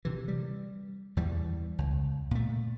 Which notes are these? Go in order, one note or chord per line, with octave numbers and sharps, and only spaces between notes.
C3 E3
G3
E2 E3 G3
C#2
A#2 A3